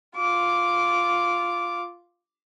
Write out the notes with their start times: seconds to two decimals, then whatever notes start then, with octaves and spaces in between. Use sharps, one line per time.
0.17 F4 D6